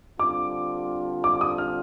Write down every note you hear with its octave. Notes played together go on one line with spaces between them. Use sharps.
D3 G3 C4 F4 D6
D6
D#6
F6